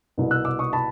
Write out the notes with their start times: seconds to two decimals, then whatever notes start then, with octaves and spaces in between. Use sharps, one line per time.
0.18 C2 B2
0.31 E6 F#6
0.45 D6 E6
0.59 C#6 D#6
0.73 A5 B5